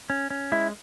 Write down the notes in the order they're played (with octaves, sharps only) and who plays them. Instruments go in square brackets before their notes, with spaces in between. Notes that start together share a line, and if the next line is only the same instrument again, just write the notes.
[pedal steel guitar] C#4
C#4
G#3 E4